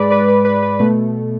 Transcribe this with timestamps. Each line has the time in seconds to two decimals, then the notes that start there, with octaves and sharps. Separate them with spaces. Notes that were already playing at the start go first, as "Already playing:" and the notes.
Already playing: G#2 G#3 B4 D5
0.10 B4 D5
0.28 B4
0.45 B4
0.63 B4
0.79 B2 A3 B4